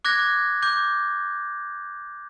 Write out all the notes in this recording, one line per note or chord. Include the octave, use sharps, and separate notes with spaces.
D6 F#6 G#6 A#6
D6 G6